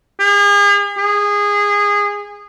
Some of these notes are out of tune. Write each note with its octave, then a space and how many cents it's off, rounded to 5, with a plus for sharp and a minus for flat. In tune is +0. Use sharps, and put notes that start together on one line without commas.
G#4 -40
G#4 -20